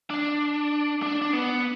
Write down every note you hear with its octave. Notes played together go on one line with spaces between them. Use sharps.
D4
D4
D4
B3